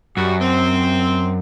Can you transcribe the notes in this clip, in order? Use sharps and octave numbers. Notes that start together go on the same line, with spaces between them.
F#2 G3 F#4
C4